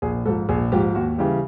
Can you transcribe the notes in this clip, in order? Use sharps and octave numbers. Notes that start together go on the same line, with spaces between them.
A#1 G#4
G#2 F3 A4
A#1 G#4
G#2 F3 G4
D#2 F#4
C#3 E3 G3 G4